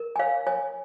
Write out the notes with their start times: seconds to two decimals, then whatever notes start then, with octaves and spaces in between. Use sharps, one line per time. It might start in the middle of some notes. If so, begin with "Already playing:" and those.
Already playing: A#4
0.16 G#5
0.19 C#5 F5
0.47 C#5 G#5